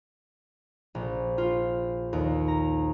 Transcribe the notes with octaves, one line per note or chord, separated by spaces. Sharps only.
A#1
F4
D#2
A#5